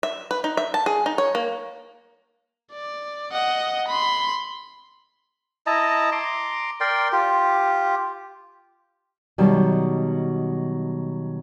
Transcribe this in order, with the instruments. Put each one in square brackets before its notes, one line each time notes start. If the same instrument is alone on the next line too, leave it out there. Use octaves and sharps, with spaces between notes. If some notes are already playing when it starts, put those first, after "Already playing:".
[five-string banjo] E5
B4
D#4
E5
A5
G#4
D#4
C#5
A#3
[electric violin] D5
D#5 F#5
B5 C6
[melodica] E4 D#5 A5 A#5
A#5 C6 D6
A#4 D5 G5 C6
F4 G4
[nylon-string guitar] B2 D#3 F#3 G3